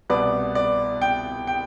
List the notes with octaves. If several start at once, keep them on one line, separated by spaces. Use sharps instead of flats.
C2 B2 B3 D5
D5
G5
G5